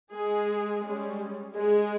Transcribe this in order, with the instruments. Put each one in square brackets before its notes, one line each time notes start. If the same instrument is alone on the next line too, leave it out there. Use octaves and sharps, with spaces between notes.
[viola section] G#3 G#4
G3 G#3 C#4 G#4
G#3 G#4